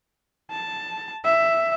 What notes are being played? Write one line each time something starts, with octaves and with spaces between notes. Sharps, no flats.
A5
E5